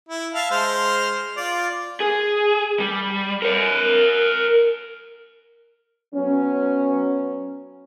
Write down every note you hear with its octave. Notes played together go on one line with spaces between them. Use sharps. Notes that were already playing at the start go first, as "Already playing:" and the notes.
E4
E5 F5 A5
G#3 C5 F6
F4 D5
G#4
G3
A#4 C#5
F#3 B3 C#4